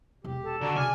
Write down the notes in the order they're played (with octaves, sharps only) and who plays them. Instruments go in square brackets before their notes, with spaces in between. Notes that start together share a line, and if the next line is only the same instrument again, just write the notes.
[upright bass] E1 [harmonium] G4
[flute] A4
[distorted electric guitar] D3 [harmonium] F#4 D5 A#5
[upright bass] C#3 B3 [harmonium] D5 [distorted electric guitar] G#5 [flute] F6